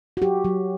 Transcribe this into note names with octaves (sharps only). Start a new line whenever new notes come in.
F#4
F#3 G4
F#3